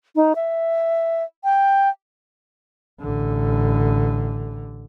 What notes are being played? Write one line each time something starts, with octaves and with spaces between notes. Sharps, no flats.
D#4
E5
G5
A1 D3